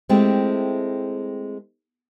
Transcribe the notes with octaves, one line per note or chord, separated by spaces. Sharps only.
G#3 A3 C4 E4 G4